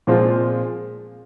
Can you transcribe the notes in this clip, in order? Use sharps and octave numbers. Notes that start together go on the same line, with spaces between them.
A#2 F3 G#3 C4 F4